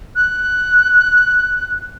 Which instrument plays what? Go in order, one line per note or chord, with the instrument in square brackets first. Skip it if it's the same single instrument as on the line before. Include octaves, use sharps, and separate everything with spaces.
[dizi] F#6